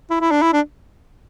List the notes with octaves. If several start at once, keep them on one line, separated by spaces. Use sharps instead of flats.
E4
E4
D4
E4
D4